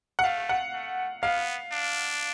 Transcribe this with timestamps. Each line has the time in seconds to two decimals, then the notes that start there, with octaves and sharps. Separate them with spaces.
0.19 F#5
0.24 A3 F5
0.49 F#5
0.73 A3
1.23 B3 F5
1.72 D4